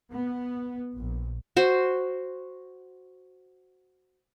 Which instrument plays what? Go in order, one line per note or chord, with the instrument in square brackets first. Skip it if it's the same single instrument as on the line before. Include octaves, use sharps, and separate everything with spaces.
[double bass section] B3
A#1
[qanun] F#4 C5